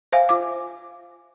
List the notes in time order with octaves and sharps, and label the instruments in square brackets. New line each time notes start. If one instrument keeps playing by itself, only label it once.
[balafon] C5 E5 F5 G#5
F4 D6